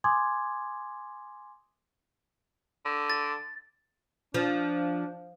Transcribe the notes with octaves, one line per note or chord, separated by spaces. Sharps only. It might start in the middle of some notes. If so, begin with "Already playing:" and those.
G#5 C6 D6 D#6 G#6
D3
A6
F3 D4